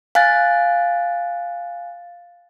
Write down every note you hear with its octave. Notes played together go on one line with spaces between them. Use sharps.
F5 G#5 F#6 A6